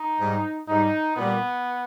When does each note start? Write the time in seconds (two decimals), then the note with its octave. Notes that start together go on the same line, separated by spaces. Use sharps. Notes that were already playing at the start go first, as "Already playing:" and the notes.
Already playing: D#4
0.19 G#2 G3
0.68 G#2 G3 D#4
1.17 A#2 G3 B3